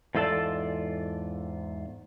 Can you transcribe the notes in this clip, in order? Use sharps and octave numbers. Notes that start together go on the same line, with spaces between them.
E2 G#2 F4 A4 D5 A5